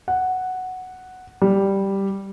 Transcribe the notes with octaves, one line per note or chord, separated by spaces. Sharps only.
F#5
G3